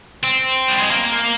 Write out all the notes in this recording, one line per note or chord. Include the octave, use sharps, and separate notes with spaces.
C4
G3
G#3
A#3